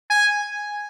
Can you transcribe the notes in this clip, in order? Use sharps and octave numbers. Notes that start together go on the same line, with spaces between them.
G#5